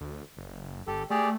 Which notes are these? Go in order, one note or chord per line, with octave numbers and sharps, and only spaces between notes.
D2
F#1
G1 G4 A4
A3 G4 G#4 D5